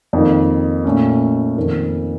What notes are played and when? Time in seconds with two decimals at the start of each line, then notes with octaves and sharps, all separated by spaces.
0.13 F2 D#3 A#3 D#4
0.84 A#2 A3 C#4
1.57 F2 D#3 A#3